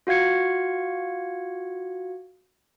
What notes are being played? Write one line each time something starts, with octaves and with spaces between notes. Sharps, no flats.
F4 F#4 F5 G#6 C#7